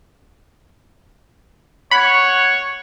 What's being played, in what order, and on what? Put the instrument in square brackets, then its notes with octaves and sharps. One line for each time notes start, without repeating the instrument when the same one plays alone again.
[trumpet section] C#5 [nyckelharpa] F#5 [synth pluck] B5